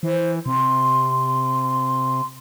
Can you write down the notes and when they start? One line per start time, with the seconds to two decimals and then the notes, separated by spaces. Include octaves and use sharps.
0.03 E3 C5
0.46 C3 C6